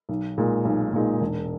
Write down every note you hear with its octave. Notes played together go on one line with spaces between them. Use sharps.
B1
A#2 G#3 D#4
B1
A#2 G#3 D#4
E1